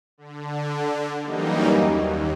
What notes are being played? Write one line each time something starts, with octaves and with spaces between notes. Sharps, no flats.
D3
F#2 E3 F#3 G3 A#3 D#4
D#2